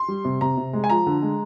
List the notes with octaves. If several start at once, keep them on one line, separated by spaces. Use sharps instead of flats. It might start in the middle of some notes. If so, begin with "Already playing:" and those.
Already playing: C6
G3
C3
C3 A#5
C3
G#3
G#5
F3 A#5
D3
G#3